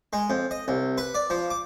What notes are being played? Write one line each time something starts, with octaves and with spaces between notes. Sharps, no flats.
G#3
F2
D#5
C2
B4
D5
F3
D6